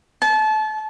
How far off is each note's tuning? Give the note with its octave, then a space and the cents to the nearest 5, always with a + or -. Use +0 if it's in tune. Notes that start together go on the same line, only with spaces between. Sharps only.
A5 -30